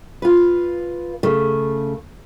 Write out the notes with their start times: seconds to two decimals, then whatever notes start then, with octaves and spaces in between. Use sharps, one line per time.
0.22 F4 B4
1.23 C#3 A3